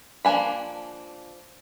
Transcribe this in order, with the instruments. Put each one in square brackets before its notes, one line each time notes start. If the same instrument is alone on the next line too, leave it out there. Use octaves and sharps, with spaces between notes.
[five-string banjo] F3 A#3 D4 G#5 B5